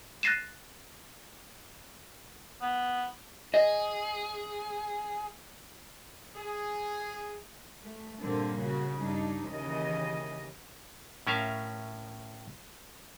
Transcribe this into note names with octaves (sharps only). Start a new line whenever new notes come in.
F#6 A6 A#6 C7 D#7 E7
B3
G#4 D#5
G#4
A3
G2 A#2 D3 A#3 C4
C#3 F#4
G2 D4 D#4
D#2 C#3 E3 D#5
A2 C#4 A#4 E5 F5